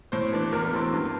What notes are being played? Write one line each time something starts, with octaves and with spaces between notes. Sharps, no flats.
A2 C5
E3 A3 D4
E2 A#4
E3 A3 C4
G2